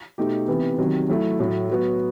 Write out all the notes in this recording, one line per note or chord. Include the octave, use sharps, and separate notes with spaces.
B2 A3 D#4 G4
C3 E3 B3
C3 D#3 F#3
F#3 A3 E4
A2 F#3 A3
F#3 B3 F#4